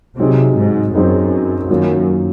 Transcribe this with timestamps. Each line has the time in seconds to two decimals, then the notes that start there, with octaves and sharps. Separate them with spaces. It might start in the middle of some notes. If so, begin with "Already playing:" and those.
0.19 C3 F#3 C4 D#4 G#4
0.57 G#2
0.94 F#2 F#3 C4 D#4 G#4
1.69 F#2 D#3 F#3 A#3 F4